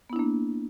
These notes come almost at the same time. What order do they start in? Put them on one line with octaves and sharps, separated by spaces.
B3 E4 D4 A#3